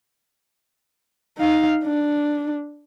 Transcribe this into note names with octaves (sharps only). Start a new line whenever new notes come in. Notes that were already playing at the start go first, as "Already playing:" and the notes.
D#4 F5
D4